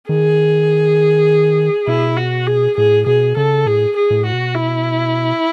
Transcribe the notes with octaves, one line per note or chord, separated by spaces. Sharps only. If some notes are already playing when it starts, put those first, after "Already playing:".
D#3 G#4
B2 E4
F#4
G#4
A2 G#4
B2 G#4
C#3 A4
A2 G#4
G#4
A2
F#4
B2
E4